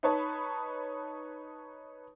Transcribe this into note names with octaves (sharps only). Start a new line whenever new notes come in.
D#4 B4 C#5 A5 B5